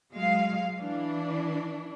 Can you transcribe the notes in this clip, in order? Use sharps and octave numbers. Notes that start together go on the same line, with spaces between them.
F#3 G#3 F5
E3 D4